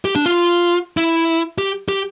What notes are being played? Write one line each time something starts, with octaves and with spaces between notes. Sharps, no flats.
G4
D4
F4
E4
G4
G4